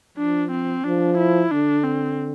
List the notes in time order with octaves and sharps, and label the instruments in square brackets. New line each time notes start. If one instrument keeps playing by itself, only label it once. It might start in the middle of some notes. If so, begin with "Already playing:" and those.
[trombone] F3 [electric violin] D4
[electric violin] C4
[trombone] F3 [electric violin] D4
[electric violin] E4
[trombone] D3 [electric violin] D4
[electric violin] C4